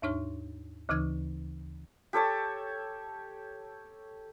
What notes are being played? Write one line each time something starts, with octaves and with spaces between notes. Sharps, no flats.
D#2 G#2 D4 D#4 C#5 F6
D2 C#3 E3 D#4 G#6
G4 A4 C#5 A5